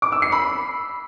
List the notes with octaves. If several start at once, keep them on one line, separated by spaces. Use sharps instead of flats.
D6
E6
C7
B5